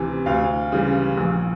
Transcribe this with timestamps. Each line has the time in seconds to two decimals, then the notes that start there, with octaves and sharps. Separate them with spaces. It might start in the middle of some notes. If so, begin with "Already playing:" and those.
Already playing: D2 C3 E3
0.26 D2 F5
0.72 C#3 E3 G3
1.18 A#1